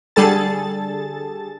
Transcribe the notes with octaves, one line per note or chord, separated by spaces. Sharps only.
D3 G3 G#4 A4 A5 A6